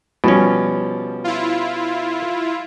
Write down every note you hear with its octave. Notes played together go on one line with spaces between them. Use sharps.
B2 F3 G3 C#4
E4 F4